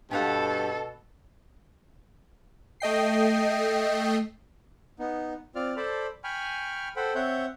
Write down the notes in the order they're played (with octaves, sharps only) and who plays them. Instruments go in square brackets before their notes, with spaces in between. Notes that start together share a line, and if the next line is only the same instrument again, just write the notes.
[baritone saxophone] G2 [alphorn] B2 [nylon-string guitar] G4 F5 F#5 [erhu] A4
[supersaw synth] A3 D#5 G5 C7
[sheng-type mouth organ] B3 D#4
C4 F4 D5 F6
A4 C5 D5 A5 B5
G5 G#5 B5 C#6 F6
A4 C5 F#5 G5 B5
C4 C#5 E5 F#5 G6